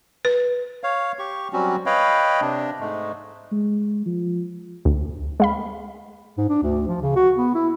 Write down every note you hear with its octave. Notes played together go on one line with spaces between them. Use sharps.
B4
C#5 F5
G4 C#6
F#3 G3 C4 C#4 F#4
B4 C#5 D#5 F5 G5 B5
C3 D4
G#2 G#3 A3
G#3
F3
D2
G#3 F5 B5
G#2
D4
D2
F3
C#3
F#4
B3
E4